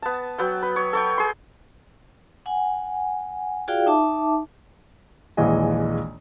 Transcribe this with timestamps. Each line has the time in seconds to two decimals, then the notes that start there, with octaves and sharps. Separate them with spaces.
0.02 B3 A5
0.38 F#3 B3 G5
0.63 B4
0.76 C#5
0.93 A4 C#5 G5
1.18 G#4 C6
2.46 F#5 G#5
3.68 F4 F#4 G#4 D5 F5 G5
3.86 D#4 E5 A5 D6
5.37 A#1 D#2 E3 G#3 D#5 G#5